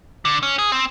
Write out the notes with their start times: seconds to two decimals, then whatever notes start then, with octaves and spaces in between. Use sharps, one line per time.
0.25 D3
0.43 C#4
0.59 G#4
0.72 C4